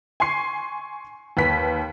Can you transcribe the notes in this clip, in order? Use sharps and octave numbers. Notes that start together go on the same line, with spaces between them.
G#5 C6 C#6 C7
D#2 B4 B6